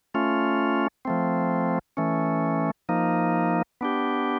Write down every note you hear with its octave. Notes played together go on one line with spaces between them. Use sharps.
A3 C#4 F4
F3 A3 C4
E3 A3 C#4
F3 A#3 D#4
B3 D4 G4